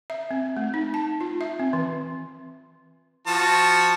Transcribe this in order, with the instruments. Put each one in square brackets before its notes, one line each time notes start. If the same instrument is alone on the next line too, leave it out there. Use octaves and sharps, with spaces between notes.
[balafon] E5
C4
A3
D#4
A5
F4
E5
C4
E3
[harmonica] F3 F#4 A5